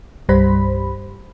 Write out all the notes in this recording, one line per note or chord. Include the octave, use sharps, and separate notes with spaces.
C2 G2 G3 C5 B5